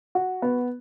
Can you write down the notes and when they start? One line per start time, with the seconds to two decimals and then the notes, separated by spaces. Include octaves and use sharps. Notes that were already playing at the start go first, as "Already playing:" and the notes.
0.15 F#4
0.42 B3